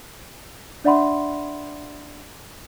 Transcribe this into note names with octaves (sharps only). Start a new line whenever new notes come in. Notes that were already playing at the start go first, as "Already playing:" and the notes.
D4 D5 E5 F#5 B5 C6